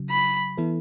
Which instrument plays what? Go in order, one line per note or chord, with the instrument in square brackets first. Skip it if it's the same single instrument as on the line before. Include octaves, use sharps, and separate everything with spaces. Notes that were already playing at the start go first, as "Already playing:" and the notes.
Already playing: [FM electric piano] C#3 F#3
[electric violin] B5
[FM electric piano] E3 B3 E4 A4